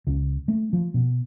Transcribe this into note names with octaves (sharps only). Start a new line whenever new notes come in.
C#2
A3
F3
B2